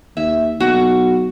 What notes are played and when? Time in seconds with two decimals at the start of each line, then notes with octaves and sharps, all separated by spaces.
0.17 D#2 E5
0.60 B1 F#4